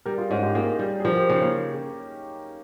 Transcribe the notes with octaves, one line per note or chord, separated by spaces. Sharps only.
G3 G4 A#4
F4 G#4
G#2 C#4 F4
D#4 G4
A#3 F4 G#4
G3
G#4
F3 G4 A#4
G4 A#4
C#3 D#4 G4
A#3 C#4